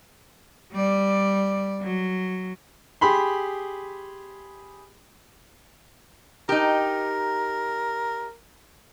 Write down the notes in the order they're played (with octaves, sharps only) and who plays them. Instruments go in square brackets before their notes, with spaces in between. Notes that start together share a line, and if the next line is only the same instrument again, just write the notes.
[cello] G3 D5
F#3
[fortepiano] G4 G#4 B5 C6
[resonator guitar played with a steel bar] D#4 G4 [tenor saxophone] A#4